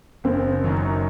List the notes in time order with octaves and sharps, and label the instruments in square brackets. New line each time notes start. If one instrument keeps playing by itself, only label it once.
[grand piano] F#1 [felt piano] C4
[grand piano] F#2 D#3 F#3